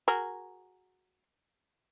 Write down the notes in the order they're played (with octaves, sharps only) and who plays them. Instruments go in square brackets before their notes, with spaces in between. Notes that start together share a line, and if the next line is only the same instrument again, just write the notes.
[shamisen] F#4 G#4 A#4